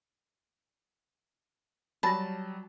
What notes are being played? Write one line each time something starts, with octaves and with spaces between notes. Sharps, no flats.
F#3 G3 A5 B5 A#6